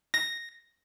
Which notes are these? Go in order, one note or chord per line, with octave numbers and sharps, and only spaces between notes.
A#6